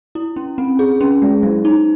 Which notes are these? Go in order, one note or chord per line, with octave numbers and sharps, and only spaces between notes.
E4
C#4
C4
G#4
C#4
G#3
F#3
D#4